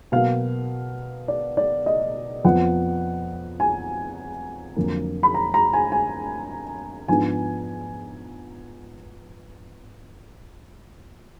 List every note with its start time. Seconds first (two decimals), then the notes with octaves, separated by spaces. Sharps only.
0.12 B2 F#3 A#3 F5
1.28 D5
1.57 D5
1.86 D#5
2.44 F2 F3 B3 F#5
3.60 G#5
4.76 F2 D3 F#3 A#3
5.23 B5
5.35 A#5
5.54 A#5
5.73 G#5
5.92 G#5
7.08 G#2 F3 B3 D4 G#5